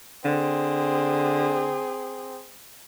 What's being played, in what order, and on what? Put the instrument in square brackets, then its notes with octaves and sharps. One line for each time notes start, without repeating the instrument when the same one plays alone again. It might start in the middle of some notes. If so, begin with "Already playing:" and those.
[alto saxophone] D3 [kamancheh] C4 G#4